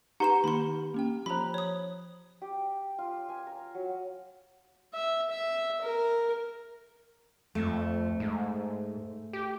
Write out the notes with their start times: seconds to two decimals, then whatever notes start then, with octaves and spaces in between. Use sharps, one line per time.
0.20 D#4 G4 B4 F#5 A#5 C6 E7
0.44 D#3 A#3 D#4 B5 C6
0.94 A#3 C#4 G5
1.26 F3 F4 C5 A#5 B5
1.54 C#5 D#6
2.42 G4
2.98 F4
3.29 G#5
3.47 A#5
3.75 F#3
4.94 E5
5.30 E5
5.82 A#4
7.55 F2 A3
8.20 G#2
9.33 G4